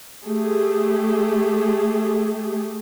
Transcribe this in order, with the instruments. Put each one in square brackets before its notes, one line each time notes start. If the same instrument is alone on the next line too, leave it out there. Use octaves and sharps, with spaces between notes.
[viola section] A3 G4 G#4